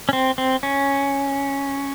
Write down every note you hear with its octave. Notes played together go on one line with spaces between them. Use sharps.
C#4
C4
C4
C#4